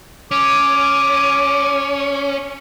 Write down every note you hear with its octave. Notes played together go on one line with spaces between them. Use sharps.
C#4 D6